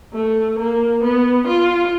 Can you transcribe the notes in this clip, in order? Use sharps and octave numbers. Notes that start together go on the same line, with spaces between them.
A3
A#3
B3
F4